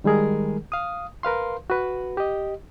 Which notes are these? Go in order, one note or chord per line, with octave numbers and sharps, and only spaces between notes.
D#3 G3 G#3 G#4 A#4
F5 D#6
A#4 B4 F5 C6
F#4 B4
G4 D#5